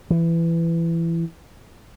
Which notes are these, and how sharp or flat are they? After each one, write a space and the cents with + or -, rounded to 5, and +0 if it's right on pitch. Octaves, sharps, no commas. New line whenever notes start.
E3 +20